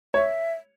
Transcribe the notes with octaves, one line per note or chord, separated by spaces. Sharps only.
C#5 E5